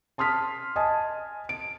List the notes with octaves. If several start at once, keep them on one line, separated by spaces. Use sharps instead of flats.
A5 C6 D#6 F6 B6
D#5 G#5 A5 D#6
D7